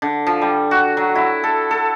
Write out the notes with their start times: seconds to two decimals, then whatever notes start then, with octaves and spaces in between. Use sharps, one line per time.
0.02 D3
0.27 F3
0.41 G3
0.71 F#4
0.97 F#3
1.15 E4
1.44 A4
1.71 A4